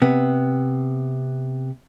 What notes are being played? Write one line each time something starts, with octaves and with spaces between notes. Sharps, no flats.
C3 B3